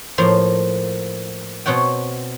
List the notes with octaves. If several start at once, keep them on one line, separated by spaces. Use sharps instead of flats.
A2 F3 A#3 C5 C6
B2 C4 C#5 F#5 G5